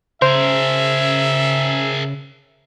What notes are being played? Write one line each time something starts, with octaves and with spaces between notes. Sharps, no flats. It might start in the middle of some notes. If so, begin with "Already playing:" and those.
C#3 G#4 A#4 C5 E5